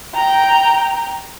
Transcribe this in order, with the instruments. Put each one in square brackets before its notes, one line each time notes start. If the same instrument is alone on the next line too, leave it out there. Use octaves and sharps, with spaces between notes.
[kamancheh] G5 A#5